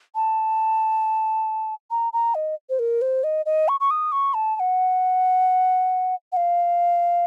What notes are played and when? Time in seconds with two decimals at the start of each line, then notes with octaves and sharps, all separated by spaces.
0.15 A5
1.91 A#5
2.13 A#5
2.35 D#5
2.70 C5
2.79 A#4
3.02 C5
3.24 D#5
3.46 D#5
3.68 C#6
3.80 C#6
3.90 D#6
4.12 C#6
4.34 A5
4.56 A5
4.60 F#5
6.32 F#5
6.36 F5